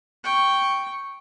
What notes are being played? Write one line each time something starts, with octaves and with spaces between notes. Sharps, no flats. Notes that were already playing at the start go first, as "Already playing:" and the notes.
G5 C#6